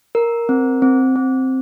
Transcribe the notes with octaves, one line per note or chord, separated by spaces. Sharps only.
A#4
C4
C4
C4